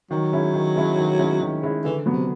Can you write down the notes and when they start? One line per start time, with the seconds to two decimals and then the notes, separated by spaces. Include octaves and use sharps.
0.11 D#3 F#3
0.32 G#3 C#4 E4
0.54 D#3
0.76 G#3 C#4 E4
0.97 D#3
1.19 G#3 C#4 E4
1.41 D#3
1.63 G#3 C#4 E4
1.84 D3 E3
2.06 F#3 B3
2.13 C3